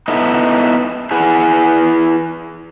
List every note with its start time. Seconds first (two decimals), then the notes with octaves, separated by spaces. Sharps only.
0.08 B3 D#4 E4 A4
1.11 E4 G#4 B4 F#5